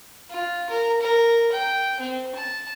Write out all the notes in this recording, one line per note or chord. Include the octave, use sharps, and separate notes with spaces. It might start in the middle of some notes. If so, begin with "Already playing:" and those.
F4
A#4
A#4
G5
C4
A5